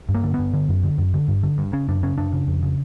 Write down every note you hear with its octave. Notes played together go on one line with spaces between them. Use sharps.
G2
A#3
D3
B3
G2
D3
F#2
D3
F#2
D3
G2
D3
G2
C#3 C#4
F#2 D4
C#3 C#4
F#2 D4
C#3
F2
C#3